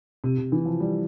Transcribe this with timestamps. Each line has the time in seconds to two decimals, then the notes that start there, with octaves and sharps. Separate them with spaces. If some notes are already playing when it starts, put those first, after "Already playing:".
0.24 C3
0.38 C3
0.52 E3
0.66 F3
0.80 G3